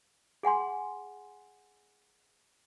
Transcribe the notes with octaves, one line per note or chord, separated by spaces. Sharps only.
G#4 F#5 G#5 C6